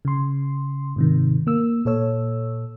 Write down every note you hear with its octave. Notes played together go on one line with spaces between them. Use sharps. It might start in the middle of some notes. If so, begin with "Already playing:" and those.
C#3 C6
G#2 C3 D#3
A#3 E6
A#2 A4 C#5 E6